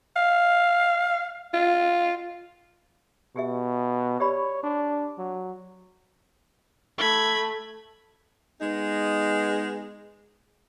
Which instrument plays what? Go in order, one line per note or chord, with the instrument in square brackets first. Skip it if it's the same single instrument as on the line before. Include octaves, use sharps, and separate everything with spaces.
[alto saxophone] F5
F4
[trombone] B2 [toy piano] G4 G#4 E5
[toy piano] G4 D5 B5 [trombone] C#5
[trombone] D4
F#3
[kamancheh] A3 [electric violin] B5 G#6
[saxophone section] G#3 B3 D#4 G#4